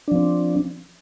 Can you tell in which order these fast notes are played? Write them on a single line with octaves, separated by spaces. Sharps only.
D4 F3 C4